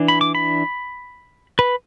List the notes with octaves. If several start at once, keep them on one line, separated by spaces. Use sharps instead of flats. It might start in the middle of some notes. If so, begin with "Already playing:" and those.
Already playing: E3 D4
B5
D6
B5
B4